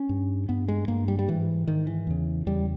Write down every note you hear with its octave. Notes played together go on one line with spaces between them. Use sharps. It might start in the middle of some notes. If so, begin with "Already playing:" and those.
Already playing: C#4
G2
G2 B3
G#3
G2 A#3
G3
G3
G#2 E3
G#2 D#3
E3
E2 C#3
E2 C#3 G3